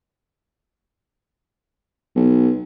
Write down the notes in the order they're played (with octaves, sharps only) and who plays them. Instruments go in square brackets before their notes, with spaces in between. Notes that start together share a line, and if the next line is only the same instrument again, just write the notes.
[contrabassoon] B1